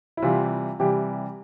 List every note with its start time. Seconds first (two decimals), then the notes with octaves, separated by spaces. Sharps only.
0.17 E4
0.22 C3 E3 G3 F4
0.80 C3 E3 G3 G4